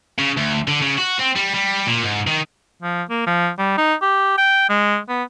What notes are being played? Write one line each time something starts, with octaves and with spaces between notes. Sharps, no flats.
C#3
D2
D3
C#3
F#4
C4
G3
G3
A#2
G#2
D#3
F3
A#3
F3
G3
D#4
G4
G5
G#3
B3